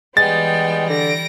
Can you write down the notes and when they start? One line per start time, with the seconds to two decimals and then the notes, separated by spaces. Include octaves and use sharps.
0.17 E3 G3 G#3 B3 G5 A6
0.89 D3 A#6 D7